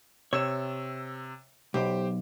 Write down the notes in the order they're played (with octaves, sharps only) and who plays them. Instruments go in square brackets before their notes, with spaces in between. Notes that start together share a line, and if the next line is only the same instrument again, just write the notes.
[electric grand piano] C3 E6 E7 [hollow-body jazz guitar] C#5
[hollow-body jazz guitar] B1 [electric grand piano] G4 C5 D6